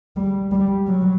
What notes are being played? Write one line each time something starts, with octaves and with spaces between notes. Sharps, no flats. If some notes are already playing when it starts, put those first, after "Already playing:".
G3
G3
F#3